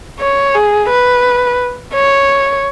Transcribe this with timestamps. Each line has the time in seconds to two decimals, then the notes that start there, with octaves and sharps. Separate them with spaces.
0.19 C#5
0.54 G#4
0.90 B4
1.94 C#5